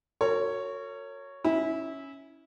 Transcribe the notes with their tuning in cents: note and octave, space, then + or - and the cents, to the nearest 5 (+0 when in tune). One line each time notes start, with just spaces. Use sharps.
F#4 +0 A#4 -40 C#5 +0
C#4 +0 E4 -20